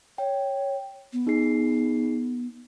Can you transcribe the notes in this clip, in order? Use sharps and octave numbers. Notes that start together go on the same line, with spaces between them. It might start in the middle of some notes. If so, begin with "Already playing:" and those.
C#5 G5
B3
D#4 G#4 C7